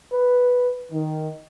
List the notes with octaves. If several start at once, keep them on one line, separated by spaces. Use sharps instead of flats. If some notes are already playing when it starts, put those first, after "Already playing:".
B4
D#3